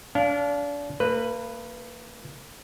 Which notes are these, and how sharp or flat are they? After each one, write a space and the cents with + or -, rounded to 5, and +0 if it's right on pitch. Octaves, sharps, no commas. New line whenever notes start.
D4 -35 F5 +0
A#3 -35 B4 +0